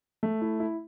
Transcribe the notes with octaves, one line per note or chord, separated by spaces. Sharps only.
A3
E4
E4